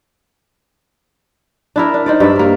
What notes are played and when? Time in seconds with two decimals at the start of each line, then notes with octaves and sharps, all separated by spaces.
1.76 D4 E4 A#4
1.94 D4
2.06 D#4 C5 D5
2.20 G2 D5 E5
2.36 A#3 A#4